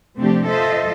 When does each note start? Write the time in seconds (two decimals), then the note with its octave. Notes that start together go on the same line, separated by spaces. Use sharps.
0.18 C3 F3 A3 C4 D4 G4
0.48 F4 A4 C5 D#5 E5